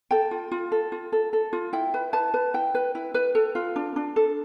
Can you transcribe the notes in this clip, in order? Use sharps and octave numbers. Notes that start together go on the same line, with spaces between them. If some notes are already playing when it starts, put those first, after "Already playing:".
A4 G5
F4
F4
A4
F4
A4
A4
F4
E4 G5
B4
B4 A5
B4
E4 G5
B4
E4
B4
A4
F4
D4
D4
A4